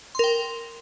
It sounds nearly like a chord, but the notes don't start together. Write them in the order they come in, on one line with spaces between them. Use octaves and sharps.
C6 A#4 G5